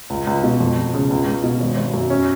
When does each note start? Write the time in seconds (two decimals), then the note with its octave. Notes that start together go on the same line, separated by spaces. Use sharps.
0.10 C#2
0.27 C#2
0.43 B2
0.60 F2
0.77 F2
0.94 C#3
1.10 C#2
1.27 C#2
1.43 B2
1.60 G#1
1.77 G#1
1.94 F#2
2.10 C#4